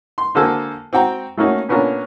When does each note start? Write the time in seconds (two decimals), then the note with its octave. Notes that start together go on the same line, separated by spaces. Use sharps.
0.18 C6
0.35 D3 A#3 F#4 A4 C5 G#5
0.93 C4 F#4 G5 A#5
1.37 A3 A#3 C#4 D#4 F#4
1.69 A#2 B3 C#4 D4 F4 A#4